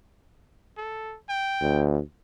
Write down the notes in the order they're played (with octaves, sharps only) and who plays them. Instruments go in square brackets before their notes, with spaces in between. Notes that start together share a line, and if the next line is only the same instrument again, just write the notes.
[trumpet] A4
G5
[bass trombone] D2